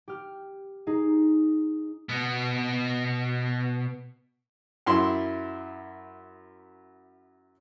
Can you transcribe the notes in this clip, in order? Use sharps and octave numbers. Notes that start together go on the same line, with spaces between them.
G4 F6
D#4 G#4 C7
B2 B3
F#2 E4 E5 C6